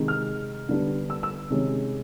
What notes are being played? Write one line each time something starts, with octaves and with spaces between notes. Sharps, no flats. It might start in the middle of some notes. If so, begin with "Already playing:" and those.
Already playing: C3 D#3 G#3
F6
D3 G3 B3 D4
E6
E6
C3 D#3 G#3 C#4